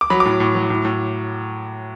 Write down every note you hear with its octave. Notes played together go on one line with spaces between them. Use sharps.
D6
F#3 B5
D6
A2
A2
F#3
A2
A2